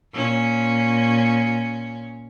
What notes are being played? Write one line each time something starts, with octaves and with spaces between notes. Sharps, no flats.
A#2 C#4